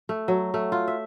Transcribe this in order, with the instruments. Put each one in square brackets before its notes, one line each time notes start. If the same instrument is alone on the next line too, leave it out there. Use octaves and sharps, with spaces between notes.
[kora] A3
F#3
A3
F4
E5